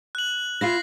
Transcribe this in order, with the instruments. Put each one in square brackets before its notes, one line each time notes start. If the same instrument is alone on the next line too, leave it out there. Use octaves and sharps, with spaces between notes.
[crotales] F#6 F#7
[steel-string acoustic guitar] E4 F4 F5 [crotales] A#6 C7